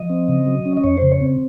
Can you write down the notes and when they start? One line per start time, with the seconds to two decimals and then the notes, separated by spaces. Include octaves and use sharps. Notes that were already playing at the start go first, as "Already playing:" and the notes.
Already playing: F3 D#5
0.09 C4
0.28 C#3
0.46 F#3
0.65 C#4
0.77 D#5
0.84 F2 C#5
0.97 C#3 C5
1.12 C#5
1.21 C4